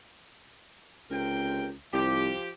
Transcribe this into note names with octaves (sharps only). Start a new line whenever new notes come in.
C#2 C3 A#4 G5
C2 F3 G4